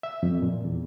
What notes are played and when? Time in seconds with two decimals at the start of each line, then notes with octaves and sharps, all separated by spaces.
0.03 E5
0.23 F2
0.42 A#2
0.65 E2